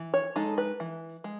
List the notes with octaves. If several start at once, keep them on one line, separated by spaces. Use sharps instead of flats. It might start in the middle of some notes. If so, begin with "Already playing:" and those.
Already playing: E3
C#5
G#3 D#4 A4
B4
E3
G#3